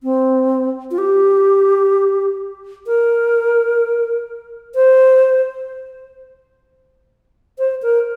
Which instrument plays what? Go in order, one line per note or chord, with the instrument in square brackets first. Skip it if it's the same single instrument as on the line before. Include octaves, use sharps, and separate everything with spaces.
[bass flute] C4
F4
G4
A#4
C5
C5
A#4